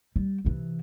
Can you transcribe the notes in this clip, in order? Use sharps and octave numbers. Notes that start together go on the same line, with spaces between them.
G3
C3 E3